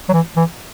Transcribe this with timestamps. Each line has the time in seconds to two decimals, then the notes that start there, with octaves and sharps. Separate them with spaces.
0.09 F#3
0.13 E3
0.36 E3